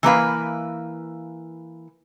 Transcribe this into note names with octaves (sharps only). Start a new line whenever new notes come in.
E3 A#3 B4 F5